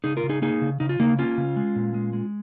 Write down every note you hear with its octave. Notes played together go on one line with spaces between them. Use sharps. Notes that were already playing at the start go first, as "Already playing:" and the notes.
C#3 D#4 G#4
F4 A#4
C#3
D#4 G#4
A#3 D#4 G#4
C#3
C#3 D#4
F4
C#3 A#3 D#4
A#3 C#4 F4
C#3
G#3
A#2
G#3
G#3